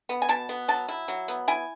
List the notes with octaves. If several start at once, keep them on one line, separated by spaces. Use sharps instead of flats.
B3
G#5
B2 A5
B3
F#3 A5
E4
F#3
B3
E4 G#5